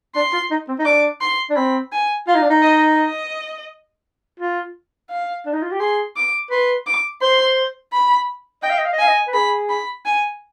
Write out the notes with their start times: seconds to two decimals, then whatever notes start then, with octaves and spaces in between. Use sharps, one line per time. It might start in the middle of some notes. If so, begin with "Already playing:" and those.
0.15 D4 C6
0.33 F4
0.50 D#4
0.68 C4
0.79 D#4
0.85 D4 D6
1.21 C6
1.50 D4
1.56 C4 B5
1.92 G#5
2.27 F4 F5
2.35 D#4
2.42 D4
2.50 D#4
2.62 D#5
2.97 D#5
4.40 F4
5.10 F5
5.46 D4
5.53 D#4
5.62 F4
5.72 G4
5.80 G#4 C6
6.16 D6
6.51 B4 C6
6.86 D6
7.22 C5 C6
7.93 B5
8.63 D#5 G5
8.70 F5
8.79 D#5
8.85 F5
8.93 D#5
8.99 F5 G#5
9.08 D#5
9.27 B4
9.33 G#4 B5
9.69 B5
10.05 G#5